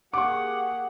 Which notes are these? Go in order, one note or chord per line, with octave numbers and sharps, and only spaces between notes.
A#3 G4 G#4 F#5 C#6 D6